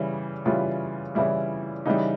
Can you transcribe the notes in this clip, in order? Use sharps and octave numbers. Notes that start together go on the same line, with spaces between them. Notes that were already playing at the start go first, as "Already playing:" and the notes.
Already playing: C#3 E3 G3
C#3 E3 G3 F4
C#3 E3 G3 E4
C#3 E3 G3 D#4